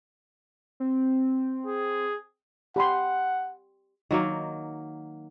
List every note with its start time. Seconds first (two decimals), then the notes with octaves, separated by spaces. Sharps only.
0.80 C4
1.66 G#4
2.76 G4 F#5 B5 C6
4.11 D#3 F#3 A#3